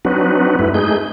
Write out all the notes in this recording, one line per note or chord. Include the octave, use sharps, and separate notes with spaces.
F#3 C4 D4 D#4 F#4 B4
G2 A3 E4 B4
G#3 A3 D#4 G#4 G6